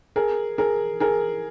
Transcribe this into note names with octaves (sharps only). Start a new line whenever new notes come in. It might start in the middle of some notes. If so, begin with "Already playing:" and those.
G#4 A#4
G#4 A#4
G#4 A#4